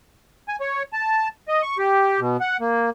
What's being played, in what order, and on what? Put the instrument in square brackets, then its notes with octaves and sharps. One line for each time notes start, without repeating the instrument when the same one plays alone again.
[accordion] G#5
C#5
A5
D#5
C#6
G4
B2
F#5
A#3